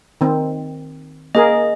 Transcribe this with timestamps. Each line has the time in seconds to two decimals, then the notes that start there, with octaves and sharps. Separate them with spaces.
0.21 D#3 C4
1.35 A#3 G#4 A#4 D#5